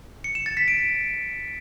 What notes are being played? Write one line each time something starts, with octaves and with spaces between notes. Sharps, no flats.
C#7
E7
A6
B6
D7